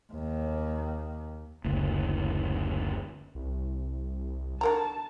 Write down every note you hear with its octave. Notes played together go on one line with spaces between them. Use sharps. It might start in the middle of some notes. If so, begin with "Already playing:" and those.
D#2
F#1 D2
C2
D3 A#4 A5 A#5